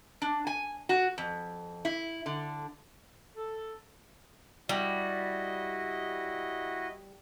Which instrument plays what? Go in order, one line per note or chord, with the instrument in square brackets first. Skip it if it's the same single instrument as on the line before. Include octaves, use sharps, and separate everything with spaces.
[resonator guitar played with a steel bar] D4
G#5
F#4
F2
E4
D3
[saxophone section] A4
[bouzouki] G3 [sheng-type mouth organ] E4 F#4 D#5